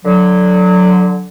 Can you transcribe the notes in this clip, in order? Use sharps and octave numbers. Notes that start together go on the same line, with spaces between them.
D3 F#3